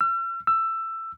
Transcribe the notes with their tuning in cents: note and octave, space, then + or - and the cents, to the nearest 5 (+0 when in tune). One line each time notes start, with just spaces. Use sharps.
E6 +45
E6 +15